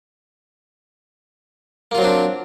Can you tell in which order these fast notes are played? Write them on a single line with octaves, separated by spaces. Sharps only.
A#3 F4 F#3 C4 D4